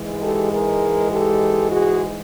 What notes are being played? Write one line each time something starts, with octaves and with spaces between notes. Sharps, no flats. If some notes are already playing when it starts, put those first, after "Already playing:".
Already playing: G#2 E3 G#3
G4 A4
G#4 A#4
G4 A4
F#4 G#4